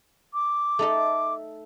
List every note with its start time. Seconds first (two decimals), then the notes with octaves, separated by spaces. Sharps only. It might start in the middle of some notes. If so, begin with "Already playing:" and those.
0.34 D6
0.79 A3 D#4 A4